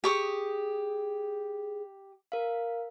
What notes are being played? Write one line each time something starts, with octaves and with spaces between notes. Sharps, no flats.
G4 G#4 C#6 D#6
A#4 F5